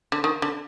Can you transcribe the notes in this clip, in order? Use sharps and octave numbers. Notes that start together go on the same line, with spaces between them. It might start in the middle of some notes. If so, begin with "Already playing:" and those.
D3
D#3
D3